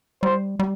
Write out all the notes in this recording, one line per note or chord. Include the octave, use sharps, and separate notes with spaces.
G3 C5
G3